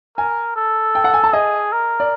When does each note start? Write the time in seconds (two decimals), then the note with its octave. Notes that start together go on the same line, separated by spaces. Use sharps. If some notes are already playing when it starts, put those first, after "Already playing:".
0.17 A#4 G#5
0.56 A4
0.95 G5
1.04 F#5
1.14 G#5
1.24 A5
1.33 G#4 D#5
1.72 A#4
2.00 D5